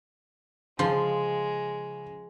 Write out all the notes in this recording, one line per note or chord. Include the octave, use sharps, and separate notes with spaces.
C#3 F3 G#3 C6